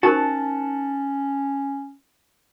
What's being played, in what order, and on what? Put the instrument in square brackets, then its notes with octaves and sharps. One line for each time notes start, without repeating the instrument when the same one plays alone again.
[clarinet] C#4 [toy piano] D#4 A#4 C5 [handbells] F#4 [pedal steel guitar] F#5 A5